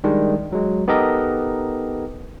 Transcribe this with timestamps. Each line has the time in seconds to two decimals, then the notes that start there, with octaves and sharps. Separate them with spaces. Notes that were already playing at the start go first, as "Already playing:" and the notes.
0.04 D#3 G3 G#3 D4
0.52 F#3 G#3
0.88 B3 D#4 G4 A4 A#4 D#5